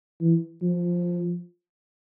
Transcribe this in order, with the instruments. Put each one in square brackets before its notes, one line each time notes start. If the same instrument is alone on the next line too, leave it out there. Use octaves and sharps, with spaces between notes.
[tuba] E3
F3